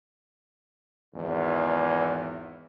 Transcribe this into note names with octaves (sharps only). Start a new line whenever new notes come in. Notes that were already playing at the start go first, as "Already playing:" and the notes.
G#1 E2